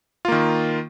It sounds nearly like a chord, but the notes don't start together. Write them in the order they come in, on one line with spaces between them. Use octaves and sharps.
F4 A#3 D#3